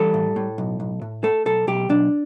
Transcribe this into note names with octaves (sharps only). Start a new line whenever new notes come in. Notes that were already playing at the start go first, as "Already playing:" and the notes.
Already playing: E3 G3 A4
A2
A2
B1
B1
A2
A3 A4
B1 A4
B1 G4
B1 D4